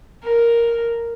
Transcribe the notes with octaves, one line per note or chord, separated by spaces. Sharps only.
A#4